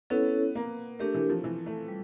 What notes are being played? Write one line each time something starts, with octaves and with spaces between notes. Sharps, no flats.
B3 C#4 E4 A4 C#5
A#3
A3 D4 G4 A#4
E3
F3
E3
A3
G3